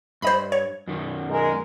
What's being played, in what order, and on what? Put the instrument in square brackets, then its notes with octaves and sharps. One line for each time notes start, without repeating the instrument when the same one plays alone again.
[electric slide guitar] G2 [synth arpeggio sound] C5 D#5 B5
[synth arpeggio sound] C#5
[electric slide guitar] F#2 D#3
[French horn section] G#3 A#4